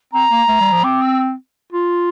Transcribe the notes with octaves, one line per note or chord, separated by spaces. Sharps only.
C4 A#5
A#3
A3
G3
F3
C4 D6
E6
F4